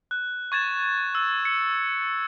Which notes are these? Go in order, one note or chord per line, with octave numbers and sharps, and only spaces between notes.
F#6
C#6 G#6 A6 E7
E6
C#7